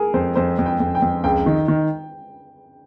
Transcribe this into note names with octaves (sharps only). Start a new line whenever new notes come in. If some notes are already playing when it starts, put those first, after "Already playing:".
Already playing: G#4 A#4
F2 C5
F2 C5
F2
G5
F2
G5
F2
C#2 G5
D#3
D#3